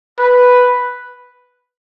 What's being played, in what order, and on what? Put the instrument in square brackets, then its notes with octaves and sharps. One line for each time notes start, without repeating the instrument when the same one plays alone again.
[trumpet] B4